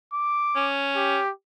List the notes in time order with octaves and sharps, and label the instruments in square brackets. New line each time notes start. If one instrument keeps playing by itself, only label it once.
[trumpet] D6
[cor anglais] C#4
[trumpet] G4